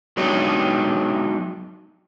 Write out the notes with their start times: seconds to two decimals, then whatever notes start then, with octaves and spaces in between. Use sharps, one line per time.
0.17 F#3 G#3 B3 D4 D#4 G4